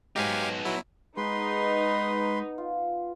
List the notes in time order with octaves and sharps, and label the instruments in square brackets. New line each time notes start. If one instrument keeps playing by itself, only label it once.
[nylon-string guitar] G#2 F#3 C5 [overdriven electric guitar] B3 D#4 [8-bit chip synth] G4 F5 G#5
[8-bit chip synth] F#3 E4
[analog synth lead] G#3 [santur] B3 [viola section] D#4 [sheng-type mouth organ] B4 C6
[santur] F4